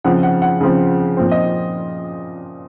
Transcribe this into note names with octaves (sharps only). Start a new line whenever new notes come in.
C#3 F3 C4 F#5
F#5
F#5
C#3 F3 C4
A#2 F3 C4
D#5